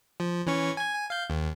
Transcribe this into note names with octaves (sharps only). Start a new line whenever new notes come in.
F3
E3 C#4 C#6
G#5 G#6
G#5
F5 G6
D#2